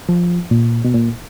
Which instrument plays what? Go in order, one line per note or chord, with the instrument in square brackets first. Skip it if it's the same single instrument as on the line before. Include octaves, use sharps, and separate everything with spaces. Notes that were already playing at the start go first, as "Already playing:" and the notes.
[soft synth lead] F3
A#2
B2
A#2